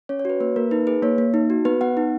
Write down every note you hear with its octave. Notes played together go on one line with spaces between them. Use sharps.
C#4 C#5
C#5
F#4 B4
A#3 B4
A#3 A#4
D#4 B4
G#4 B4
A#3 C#5
A#3
D#4
F#4
B3 B4
B3 F#5
D#4